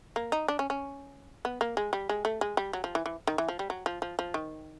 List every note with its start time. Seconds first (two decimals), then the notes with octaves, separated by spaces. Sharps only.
0.16 A#3
0.32 D#4
0.48 D4
0.59 C#4
0.70 C#4
1.45 B3
1.61 A#3
1.77 G#3
1.93 G3
2.09 G#3
2.25 A3
2.41 G#3
2.57 G3
2.73 F#3
2.84 F3
2.95 E3
3.06 E3
3.27 D#3
3.38 E3
3.49 F3
3.59 G3
3.70 F#3
3.86 F3
4.02 F3
4.19 F3
4.34 D#3